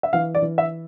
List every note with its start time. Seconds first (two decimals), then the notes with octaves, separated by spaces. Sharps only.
0.03 E5
0.13 E3 F5
0.35 D5
0.42 E3
0.58 E5